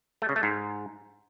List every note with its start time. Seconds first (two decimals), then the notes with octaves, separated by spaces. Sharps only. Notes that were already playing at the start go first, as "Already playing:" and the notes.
0.22 A3
0.29 C#3
0.36 A3
0.43 G#2